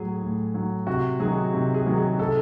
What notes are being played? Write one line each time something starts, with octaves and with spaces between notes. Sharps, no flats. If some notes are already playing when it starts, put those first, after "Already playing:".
Already playing: A2 F#3 G#4
A2
F#3
C3 F#4
D#3 F#3 G#4
C3
G#4
D#3 F#3
G#4
C3 A4